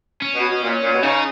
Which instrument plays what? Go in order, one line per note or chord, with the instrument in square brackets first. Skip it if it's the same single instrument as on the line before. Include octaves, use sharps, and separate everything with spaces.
[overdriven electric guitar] C#4
[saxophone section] B2
B2
A#2
A#2
B2
[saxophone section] C#3 [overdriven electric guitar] D#4